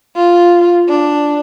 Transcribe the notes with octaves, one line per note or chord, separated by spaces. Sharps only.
F4
D4